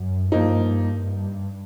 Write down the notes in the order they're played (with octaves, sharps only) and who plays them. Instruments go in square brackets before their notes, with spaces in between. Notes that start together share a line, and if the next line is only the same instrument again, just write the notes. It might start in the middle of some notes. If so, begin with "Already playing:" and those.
Already playing: [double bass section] F#2
[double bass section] G2 [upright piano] F3 A#3 D#4
[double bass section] G2